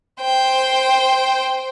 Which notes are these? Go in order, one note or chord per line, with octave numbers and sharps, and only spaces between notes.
C5 G5